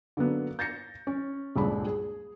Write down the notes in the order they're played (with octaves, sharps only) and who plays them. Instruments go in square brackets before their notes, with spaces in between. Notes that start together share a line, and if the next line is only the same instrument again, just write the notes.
[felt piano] D3 F#3 A#3 B3
G6 A6 A#6 C#7
C#4
D#1 C#2 G2 D4 G#4 B5
G#4